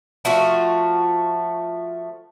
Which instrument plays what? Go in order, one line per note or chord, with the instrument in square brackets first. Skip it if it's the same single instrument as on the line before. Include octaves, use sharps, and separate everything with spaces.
[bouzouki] F3 A3 F4 F#4